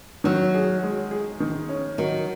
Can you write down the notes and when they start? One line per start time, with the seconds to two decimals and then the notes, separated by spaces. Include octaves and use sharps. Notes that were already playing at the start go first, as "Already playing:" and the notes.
0.24 D#3 F#3
0.54 G#4
0.83 G#3
1.11 G#4
1.40 D#3
1.69 C#4
1.98 D#3 F#3